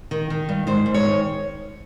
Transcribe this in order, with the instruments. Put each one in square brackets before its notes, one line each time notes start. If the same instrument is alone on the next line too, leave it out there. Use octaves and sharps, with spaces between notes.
[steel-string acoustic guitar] D#3
D#3
G2
G#2 C5
G#2
C#5
D#3